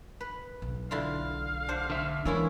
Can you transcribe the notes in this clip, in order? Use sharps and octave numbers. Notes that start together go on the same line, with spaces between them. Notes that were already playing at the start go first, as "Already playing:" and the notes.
B4
B1
D3 E4 F4 F5
D4 C5 F#5
D3 E5
E3 G#3 A#3 C#4 D4 E4 F4